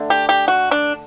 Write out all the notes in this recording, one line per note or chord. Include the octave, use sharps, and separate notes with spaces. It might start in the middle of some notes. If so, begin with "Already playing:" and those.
Already playing: D3 A3
G4
G4
F#4
D4